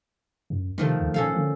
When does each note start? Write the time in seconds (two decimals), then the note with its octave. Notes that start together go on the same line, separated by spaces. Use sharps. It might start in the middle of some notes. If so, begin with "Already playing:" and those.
0.50 F#2
0.78 C3 D#3 F3 A3
1.00 D2
1.14 A#2 C#4 A4 F5
1.35 D3